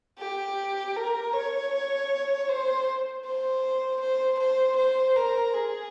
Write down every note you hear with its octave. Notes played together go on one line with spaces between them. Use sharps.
G4
A#4
C#5
C5
C5
C5
C5
C5
A#4
G#4